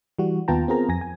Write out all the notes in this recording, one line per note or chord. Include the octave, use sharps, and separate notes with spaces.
E3 G3 F#4
D#2 B3 F4 G5 A5 A#5
B3 C4 F4 G#4 A#4 A#5
F2 G#5 A#6
G#5